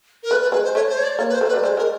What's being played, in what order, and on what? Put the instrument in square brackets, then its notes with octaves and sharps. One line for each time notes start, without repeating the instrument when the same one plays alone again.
[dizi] A#4
[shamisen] A3 [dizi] B4
[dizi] B4
[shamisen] G#3 [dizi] B4
[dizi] C5
[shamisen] A3 [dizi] C#5
[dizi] C5
C#5
D5
[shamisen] A#3 [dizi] C#5
[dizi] B4
C5
[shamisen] A3
[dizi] B4
[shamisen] G3
[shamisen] G#3 [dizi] C5
[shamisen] G#3 [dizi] A#4